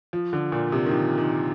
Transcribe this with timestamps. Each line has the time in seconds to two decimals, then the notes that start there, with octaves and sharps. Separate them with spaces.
0.13 F3
0.33 D3
0.52 A#2
0.72 C3
0.86 D#3
0.91 F3
1.18 D#3